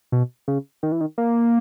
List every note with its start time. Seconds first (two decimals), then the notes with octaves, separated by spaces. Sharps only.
0.12 B2
0.48 C#3
0.83 D#3
0.92 E3
1.01 D#3
1.18 A#3